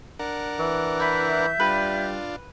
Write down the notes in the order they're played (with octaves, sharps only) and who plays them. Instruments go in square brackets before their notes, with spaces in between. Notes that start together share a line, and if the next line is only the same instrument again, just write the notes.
[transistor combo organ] D4 A#4 F#5
[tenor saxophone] E3
[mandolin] E4 B4 [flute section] E5 G6
[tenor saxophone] G3 [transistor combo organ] D4 F4 [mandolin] B4